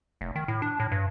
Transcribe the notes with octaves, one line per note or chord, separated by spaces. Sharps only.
F1
D#3
A2
D4
A2
G2